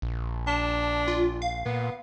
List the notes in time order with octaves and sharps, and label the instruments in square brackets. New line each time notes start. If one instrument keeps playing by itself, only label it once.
[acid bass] A#1
[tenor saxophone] D4 [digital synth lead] A5
[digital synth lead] F4
F5
[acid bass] A#2 [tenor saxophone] B3